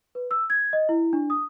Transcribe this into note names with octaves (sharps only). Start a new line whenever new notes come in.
B4
E6
G#6
D#5
E4
D4
D#6